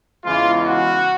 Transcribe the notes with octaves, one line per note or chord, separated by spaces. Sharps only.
E2 C#3 E3 G#3 F4
F#4